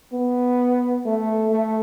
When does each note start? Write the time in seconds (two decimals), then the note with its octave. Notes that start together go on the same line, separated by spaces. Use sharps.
0.13 B3
1.05 A3
1.52 A3